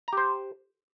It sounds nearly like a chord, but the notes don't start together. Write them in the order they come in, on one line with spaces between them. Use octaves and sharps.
A#5 G4 C5